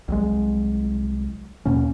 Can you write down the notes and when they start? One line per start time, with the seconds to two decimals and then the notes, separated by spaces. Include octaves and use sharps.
0.08 C2 F#3 G#3
1.65 D#2 B2 A#3 C#4